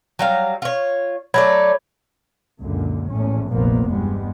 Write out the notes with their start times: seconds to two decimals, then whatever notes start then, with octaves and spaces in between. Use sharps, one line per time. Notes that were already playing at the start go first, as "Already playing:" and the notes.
0.19 F#3 G3 F5
0.62 F4 C#5
1.34 F#3 A3 C#5 D5 B5 G#6
2.61 C#2 F#2 A#2 D3
3.10 A#1 E2 A2 C#4
3.52 F1 A#1 A#2 F3 A#3 B3
3.90 E2 G2 G3 G#3 B3